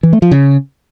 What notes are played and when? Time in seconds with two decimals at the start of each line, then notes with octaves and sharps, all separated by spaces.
0.03 E3
0.13 A3
0.22 F3
0.31 C#3